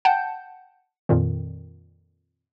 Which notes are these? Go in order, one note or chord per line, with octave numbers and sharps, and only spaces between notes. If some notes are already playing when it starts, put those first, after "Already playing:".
F#5 G5 A5 G6
F2 A#2 D#3